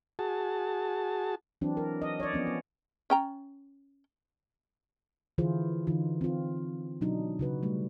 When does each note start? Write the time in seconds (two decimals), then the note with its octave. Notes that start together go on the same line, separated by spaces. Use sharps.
0.19 F#4 G#4 A5
1.61 E3 F#3 C4 D4
1.77 A#4
2.02 D#5
2.20 C#5 D5
2.33 F3 B3 C#4
2.47 B3
3.10 C#4 G5 A#5
5.38 D3 E3 E4 F4 G#4 C5
5.87 D3 E3 D#4 F4
6.21 C4 F4
7.01 B2 F#3 D4 D#4
7.39 C#3 F#4 B4
7.63 G3 A3